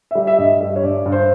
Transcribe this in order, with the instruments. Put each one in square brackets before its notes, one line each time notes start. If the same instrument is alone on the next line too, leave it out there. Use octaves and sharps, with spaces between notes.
[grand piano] E5
G3
E5
G2 D#5
G3
C#5
G2 D5
G2
C5